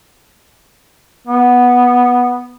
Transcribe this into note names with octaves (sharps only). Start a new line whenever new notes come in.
B3